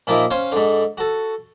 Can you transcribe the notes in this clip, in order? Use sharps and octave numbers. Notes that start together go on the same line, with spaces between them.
A#2 F3 A#3 D#4 E4
C#4 C5 F5 G#5
G#2 D3
F#4 A4